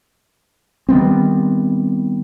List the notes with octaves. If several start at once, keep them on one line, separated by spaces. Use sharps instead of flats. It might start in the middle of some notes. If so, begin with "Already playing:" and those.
D#3 G3 B3 C4